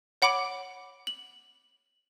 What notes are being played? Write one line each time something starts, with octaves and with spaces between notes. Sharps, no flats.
C#5 F#5 B5 D6 D7 F#7
F#7